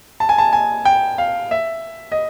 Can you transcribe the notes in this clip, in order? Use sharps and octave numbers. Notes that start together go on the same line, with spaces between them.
A5
G#5
A5
G#5
G5
F5
E5
D#5